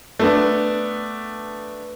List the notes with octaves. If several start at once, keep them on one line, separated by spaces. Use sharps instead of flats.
A3 B3 D4